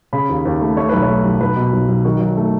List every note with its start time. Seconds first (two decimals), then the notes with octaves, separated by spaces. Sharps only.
0.13 C#3 B5
0.29 D#2
0.45 D#2
0.61 A3
0.77 A3 C#5
0.89 B1 B4
1.02 C#5
1.09 A3
1.25 B1
1.41 B1 B4
1.56 B2
1.73 B1
1.88 B1
2.05 D#3 F#4
2.20 F#3
2.37 A3